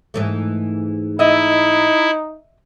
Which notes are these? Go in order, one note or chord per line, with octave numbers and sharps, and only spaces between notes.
G#2 E3 A3
D#4 E4 D#5 E5